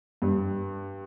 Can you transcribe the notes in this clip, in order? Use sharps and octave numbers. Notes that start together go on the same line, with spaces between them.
G2